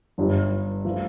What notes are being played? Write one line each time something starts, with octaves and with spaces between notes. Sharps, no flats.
G1 G2 G3
F3 A3